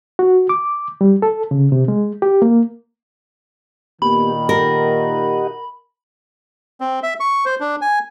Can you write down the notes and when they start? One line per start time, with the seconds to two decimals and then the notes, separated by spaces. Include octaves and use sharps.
0.19 F#4
0.49 D6
1.01 G3
1.22 A4
1.51 C#3
1.72 C3
1.88 G#3
2.22 G4
2.42 A#3
4.02 A#2 D#3 A#3 B3 G4 B5
4.49 G4 A#4 D#5 F#5
6.81 C4
7.03 E5
7.20 C#6
7.45 C5
7.60 D4
7.81 G#5